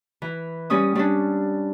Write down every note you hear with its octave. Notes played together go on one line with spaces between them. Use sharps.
E3
G3 C#4 D#6
G3 C#4 D4